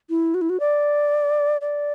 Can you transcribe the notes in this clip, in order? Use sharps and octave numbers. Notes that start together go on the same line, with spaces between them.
E4
F#4
E4
F#4
D5
D5